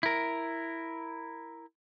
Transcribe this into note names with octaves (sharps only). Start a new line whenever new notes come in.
E4 A#4